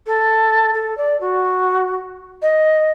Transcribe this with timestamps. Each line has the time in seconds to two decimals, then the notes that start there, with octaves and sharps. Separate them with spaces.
0.06 A4
0.74 A4
0.97 D5
1.20 F#4
2.42 D#5